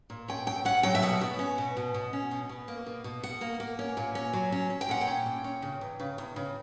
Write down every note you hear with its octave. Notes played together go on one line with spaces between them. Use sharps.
A#2
C#4 G5
F#3 G5
C#4 F#5
F#3 G5
E5
B2 F#5
B2
C#4
B2
B2
B2
C#4
B2
B2
A#3
B2
B2
B2 F#5
A#3
A#3
C#4
A#2
C#4
F#3
C#4
C#4
G5
A#2 F#5
G5
C#4
A#2
C#4
C#3
E2
C#3
E2
C#3